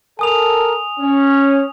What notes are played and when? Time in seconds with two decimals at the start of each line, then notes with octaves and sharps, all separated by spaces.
0.19 A4 A#4 G#5 D#6 F7
0.99 C#4